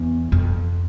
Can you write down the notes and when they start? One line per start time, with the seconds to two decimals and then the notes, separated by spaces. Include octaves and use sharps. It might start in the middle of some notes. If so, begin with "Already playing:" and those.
Already playing: E2
0.32 F2